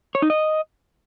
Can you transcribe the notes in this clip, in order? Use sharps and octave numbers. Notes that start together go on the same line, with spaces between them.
C#5
D#4
D#5